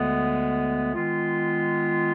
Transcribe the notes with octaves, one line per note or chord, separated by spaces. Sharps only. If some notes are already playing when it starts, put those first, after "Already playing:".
Already playing: D2 D3 G#3 B3
D#3 G#3 B3 F4